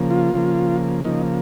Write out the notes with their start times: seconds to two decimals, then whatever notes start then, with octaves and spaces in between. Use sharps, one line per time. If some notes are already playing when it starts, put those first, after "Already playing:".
Already playing: C#3 F3 A#3
0.11 F4
0.34 C#3 F3 A#3
1.04 C#3 F3 A#3 D#4